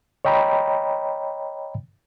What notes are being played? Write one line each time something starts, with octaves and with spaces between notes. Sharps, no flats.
C#5 D#5 G5 A#5 B5